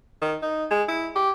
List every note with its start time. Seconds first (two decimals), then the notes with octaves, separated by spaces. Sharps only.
0.21 D#3
0.42 D#4
0.71 G#3
0.88 E4
1.16 G4